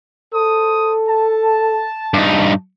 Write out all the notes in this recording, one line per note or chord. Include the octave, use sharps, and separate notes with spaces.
A4 C5 D#6
A5
G2 D#4